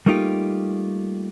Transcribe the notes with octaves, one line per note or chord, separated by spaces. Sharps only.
G3 A3 A#3 D#4 F4 G4